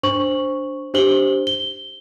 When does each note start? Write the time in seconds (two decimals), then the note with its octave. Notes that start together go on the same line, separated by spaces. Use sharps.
0.03 D4 C5 C#6 F#7
0.94 D4 G4 C5 F#7 G7
1.47 G7